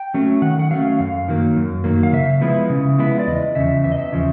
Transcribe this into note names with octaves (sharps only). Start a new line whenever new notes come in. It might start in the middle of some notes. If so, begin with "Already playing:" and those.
Already playing: G5
F#3 A3 C#4
D#3 F#5
F#5
F#3 A3 C#4 F5
F#2 F5
D#3 F#3 A#3
F#2
D#3 F#3 A#3
F5
C#3 E5
F3 G#3 B3 E4
C#3
F3 G#3 B3 E4
D5
E2 D#5
C#3 F3 E5
E2 E5
D#5
E5
C#3 F3